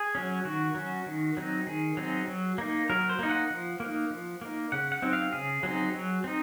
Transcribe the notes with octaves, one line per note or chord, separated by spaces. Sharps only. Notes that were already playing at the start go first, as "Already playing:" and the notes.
Already playing: G#4
F#3 C#4
D#3 F#4
F#3 C#4
D#3
F#3 C4 D#4
D#3 G#4
F#3 C4 D#4
F#3
A#3 D#4
F#3 A#4
C5
A#3 D#4
F#5
F3
A#3 D#4
F3
A#3 D#4
C#3 F#5
F#5
F#3 C4 D#4
F5
C#3 G#4
F#3 C4 D#4
F#3
C4 D#4